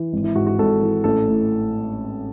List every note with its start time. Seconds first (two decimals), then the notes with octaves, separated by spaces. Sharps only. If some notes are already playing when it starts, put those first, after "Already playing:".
Already playing: E3
0.13 G#1
0.24 E4
0.35 G#2 F#4
0.47 F#4
0.59 G#1 A4
0.82 E3
1.04 A1 A4
1.27 A2